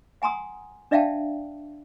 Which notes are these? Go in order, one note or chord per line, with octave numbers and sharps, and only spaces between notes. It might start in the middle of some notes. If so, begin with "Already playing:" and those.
F#5 G#5 A#5 C6 D#6
D4 D5 E5 F5 G5 A5